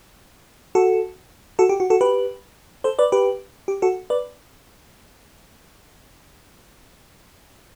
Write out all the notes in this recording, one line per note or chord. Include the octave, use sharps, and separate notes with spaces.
F#4 A4
F#4 A4
G4
F#4
F#4 A4
G4 B4
A4 C5
B4 D5
G4 B4
G4
F#4 A4
B4 D5